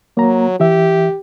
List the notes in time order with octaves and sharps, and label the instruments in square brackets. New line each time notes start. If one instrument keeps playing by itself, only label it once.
[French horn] F#3 [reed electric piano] A#3 A#5
[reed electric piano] E3 E5 [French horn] G4